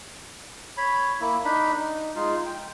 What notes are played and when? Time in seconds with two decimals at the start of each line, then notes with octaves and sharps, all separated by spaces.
0.77 C#5 B5
1.21 A#3 E4
1.44 D4 D#4 B5
1.75 D#4
2.16 G#3 D#4 F4
2.46 G5